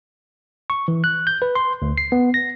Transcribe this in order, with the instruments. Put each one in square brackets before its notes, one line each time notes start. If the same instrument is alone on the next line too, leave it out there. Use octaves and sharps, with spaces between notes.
[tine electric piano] C#6
E3
F#6
G6
B4
C6
D2
C7
B3
A#6